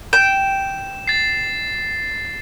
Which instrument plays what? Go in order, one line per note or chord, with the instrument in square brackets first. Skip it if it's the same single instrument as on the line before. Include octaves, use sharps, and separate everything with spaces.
[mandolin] G5 [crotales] E7
[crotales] A6 C7